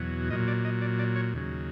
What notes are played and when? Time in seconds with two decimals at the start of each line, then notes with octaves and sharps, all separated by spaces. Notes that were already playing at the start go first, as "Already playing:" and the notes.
Already playing: E2 B2 F#3
0.31 A#2 F#3 D#5
0.48 D5
0.65 D#5
0.81 D5
0.99 D5
1.16 C#5
1.33 D#2 C#3 F#3